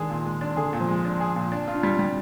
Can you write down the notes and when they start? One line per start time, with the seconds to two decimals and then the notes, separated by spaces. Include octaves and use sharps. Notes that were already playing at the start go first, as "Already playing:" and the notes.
Already playing: D#3 G#3 D4 G#4
0.10 A#2
0.25 G#3
0.41 D4
0.56 D3 G#4
0.73 A#2
0.81 F3
0.89 G#3
1.05 D4
1.20 G#4
1.36 A#2
1.52 D4
1.68 F4
1.75 D4
1.83 G3
1.99 G3